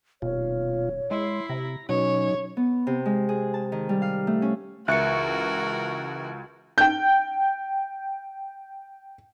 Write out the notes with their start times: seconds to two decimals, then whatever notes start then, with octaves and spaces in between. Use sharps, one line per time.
0.22 D#1 B2 F4 C#5
1.11 G#3 E4 C6
1.49 C3 A#5
1.89 B2 F#3 C#4 D#4 C#5
2.57 B3
2.87 C3
3.06 G#3
3.29 G#4
3.54 A5
3.72 D#3
3.89 G3
4.02 F5
4.27 A3
4.42 C#4
4.88 C#2 E3 F#4 A#4 E5 C#6 F#6 C#7
6.78 G5 G6